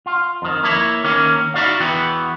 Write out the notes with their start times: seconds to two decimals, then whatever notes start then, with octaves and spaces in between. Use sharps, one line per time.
0.06 F4
0.42 F2 D#3
0.63 A#3 E4 C#5
1.04 D#3 A#3 C#4
1.54 D#4 E4 F#4 D5 F5
1.80 E2 E3 B3 F#4 G5